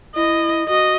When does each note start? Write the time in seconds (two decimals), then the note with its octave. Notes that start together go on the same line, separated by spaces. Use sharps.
0.15 E4 D#5
0.68 F#4 D#5